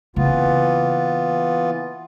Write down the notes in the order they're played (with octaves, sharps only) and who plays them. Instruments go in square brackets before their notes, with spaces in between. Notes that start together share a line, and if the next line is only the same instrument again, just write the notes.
[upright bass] C#3 A#3 [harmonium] E3 B3 F4